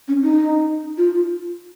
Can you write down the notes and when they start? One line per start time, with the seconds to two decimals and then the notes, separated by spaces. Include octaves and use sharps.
0.08 C#4
0.23 D#4
0.98 F4